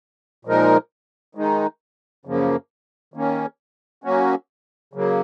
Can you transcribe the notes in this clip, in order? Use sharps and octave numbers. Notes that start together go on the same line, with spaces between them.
A#2 F3 G#3 D#4 A#4
D#3 G#3 D#4
F#2 C#3 F3 A#3
D#3 A#3 C#4
F#3 A#3 C#4 F#4
C#3 F#3 A#3